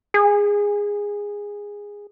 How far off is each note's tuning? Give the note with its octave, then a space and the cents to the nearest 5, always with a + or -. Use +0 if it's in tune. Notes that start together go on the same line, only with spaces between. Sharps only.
G#4 -15